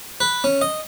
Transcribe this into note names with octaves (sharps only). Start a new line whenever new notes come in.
B4
C#4
D#5